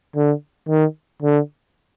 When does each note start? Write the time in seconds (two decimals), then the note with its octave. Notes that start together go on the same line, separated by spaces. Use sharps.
0.16 D3
0.69 D#3
1.23 D3